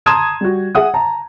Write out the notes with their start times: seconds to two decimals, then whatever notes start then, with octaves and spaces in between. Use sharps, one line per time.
0.06 A5 A#5 C6 D#6 G#6 E7
0.41 G3 F#4
0.75 G#4 E5 F#5 D#6
0.94 A5 A#5